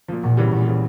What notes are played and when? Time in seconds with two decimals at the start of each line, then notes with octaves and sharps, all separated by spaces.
0.08 A#2 F3
0.23 E2 A#2
0.37 C#3 E3 G3
0.52 E2 A#2
0.67 C#3 E3 G3